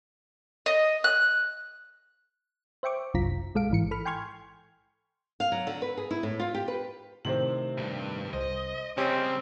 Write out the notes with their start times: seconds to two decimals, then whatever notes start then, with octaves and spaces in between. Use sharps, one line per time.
0.66 D#5
1.04 F#6
2.83 C5 E5 G5 C#6 D6
3.14 G1 C2 F#2 F4 A#5 B6
3.55 A#1 G#3 A4 F5 D7
3.70 A1 G#2 E3 C#7
3.91 A4 B5 F6
4.06 G5 G#5 C6 C#6 F6 G#6
5.40 F5
5.52 F#3
5.67 D3
5.82 B4
5.97 G#4
6.11 E4
6.23 A2
6.40 F4
6.54 G4
6.68 B4
7.25 A2 C3 D#3 C4 C5 F#7
7.78 B1 G2
8.33 C2 C5 D#5
8.98 C#3 G3 C4 C#4 G4 D#5